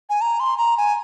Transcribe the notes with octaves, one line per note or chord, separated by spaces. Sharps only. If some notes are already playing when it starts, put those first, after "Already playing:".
G#5
A#5
C6
A#5
G#5